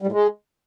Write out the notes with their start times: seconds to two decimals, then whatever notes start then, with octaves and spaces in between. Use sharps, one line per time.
0.02 G3
0.07 A2
0.12 G#3